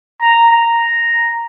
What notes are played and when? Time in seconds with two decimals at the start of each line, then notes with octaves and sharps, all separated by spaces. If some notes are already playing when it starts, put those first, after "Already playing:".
0.21 A#5
0.51 A#5